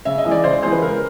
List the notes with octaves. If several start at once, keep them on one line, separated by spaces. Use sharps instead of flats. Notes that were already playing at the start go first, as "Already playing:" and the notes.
C#3 E5
D#5
E3 G#3
D5
C#3 C5
E3 G#3 C5
B4
C#3 A#4